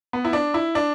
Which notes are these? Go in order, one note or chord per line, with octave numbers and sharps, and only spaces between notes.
B3
E4
D4
E4
D4